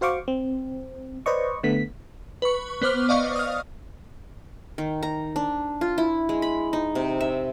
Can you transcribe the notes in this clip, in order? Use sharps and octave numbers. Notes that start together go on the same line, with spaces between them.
F#4 C5 F5 C#6 D6
C4
B4 C5 D5 D#5 C#6
D3 A3 B3 B6
B4 C#6
B3 B4 C5 D6 F6
D5 D#5 F5 C#6
D#6 F6
D#3
A#5
D4
F4
E4
G#3
B5
D#4
C3
E5